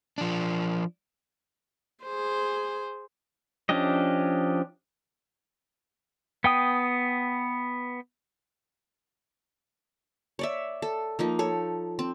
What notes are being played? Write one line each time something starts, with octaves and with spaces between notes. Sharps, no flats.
F3 D4
G#4 C5
F3 C#4 D4 G4 D#5
B3 G5 D#6
C#5 D5 E5
A4
F3 A#3 D#4
A4 C#5
C4